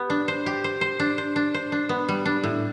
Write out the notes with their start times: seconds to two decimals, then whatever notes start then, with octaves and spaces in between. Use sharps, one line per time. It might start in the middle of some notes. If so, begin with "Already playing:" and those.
Already playing: B3 G4
0.10 D4
0.28 C5
0.46 G4
0.64 C5
0.81 C5
1.00 D4
1.18 C5
1.36 D4
1.54 C5
1.72 D4
1.89 B3
2.09 G3
2.25 D4
2.44 A2